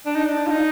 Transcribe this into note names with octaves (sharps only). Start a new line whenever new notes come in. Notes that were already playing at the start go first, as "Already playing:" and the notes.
D4
D#4
D4
F4
D#4